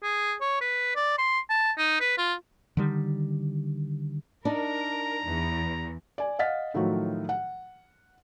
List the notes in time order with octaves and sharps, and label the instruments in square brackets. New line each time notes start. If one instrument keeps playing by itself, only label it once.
[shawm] G#4
C#5
B4
D5
C6
A5
D#4
B4
F4
[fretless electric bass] D3 D#3 G3
[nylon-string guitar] D4 D#4 [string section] A#4 [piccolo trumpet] A#5
[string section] E2
[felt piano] D5 G#5
D#5 F5 F#5 F6 A6 B6
A2 D#3 F3 F#3 A3 F#4
F#5